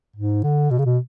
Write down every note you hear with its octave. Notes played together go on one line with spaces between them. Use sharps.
G#2
D3
B2
C#3
B2